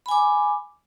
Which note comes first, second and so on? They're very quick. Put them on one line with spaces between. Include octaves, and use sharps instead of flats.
B5 G#5 D6